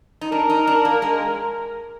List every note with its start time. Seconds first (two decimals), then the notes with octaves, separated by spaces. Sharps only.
0.21 D#4
0.32 D4 A#4
0.50 D#4
0.67 D4
0.85 A#3
1.02 G#3